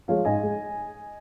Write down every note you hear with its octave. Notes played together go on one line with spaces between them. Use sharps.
F3 G#3 C#5 F5
G#2 D#5 G#5
G#3